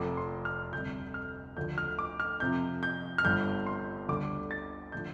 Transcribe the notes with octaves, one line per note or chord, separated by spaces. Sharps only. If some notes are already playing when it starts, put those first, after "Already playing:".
Already playing: F1 F2 F3 A3 D6
C6
F6
D2 C3 G3 G6
F6
D2 D3 F3 A3 G6
F6
D6
F6
F2 C3 F3 G6
G6
F6
G1 G2 G3 G6
C6
D2 D3 G3 D6
A6
D3 F3 A3 G6